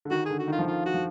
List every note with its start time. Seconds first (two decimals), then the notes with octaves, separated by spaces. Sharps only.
0.05 D3
0.11 D#3 F#4
0.25 D3 G#4
0.39 F#4
0.48 D#3 F4
0.59 F3
0.66 D#3 F4
0.85 F#4
0.94 F3